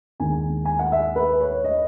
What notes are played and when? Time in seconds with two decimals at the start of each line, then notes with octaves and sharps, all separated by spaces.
0.20 D#2 D#3 G#3 G#5
0.65 G#5
0.79 F#5
0.92 E5
1.16 B4
1.40 C#5
1.64 D#5